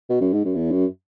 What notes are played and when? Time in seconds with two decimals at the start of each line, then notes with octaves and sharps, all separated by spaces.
0.10 B2
0.21 F#2
0.33 G#2
0.45 F#2
0.56 E2
0.71 F#2